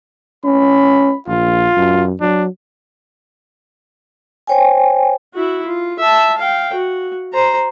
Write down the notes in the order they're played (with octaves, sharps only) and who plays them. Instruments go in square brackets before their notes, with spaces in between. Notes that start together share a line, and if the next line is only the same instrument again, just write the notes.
[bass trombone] C#4 [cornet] B5
[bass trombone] A#1 [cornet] F4
[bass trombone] F#2
[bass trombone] F#3 [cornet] D4
[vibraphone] C5 C#5 G5 G#5
[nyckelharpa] E4 F#4
F4
E5 A5
F5 G5
F#4
C5 A#5